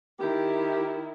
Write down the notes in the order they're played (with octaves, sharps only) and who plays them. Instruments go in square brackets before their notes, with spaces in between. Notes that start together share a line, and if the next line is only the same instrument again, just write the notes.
[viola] D#3 E4 [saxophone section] G4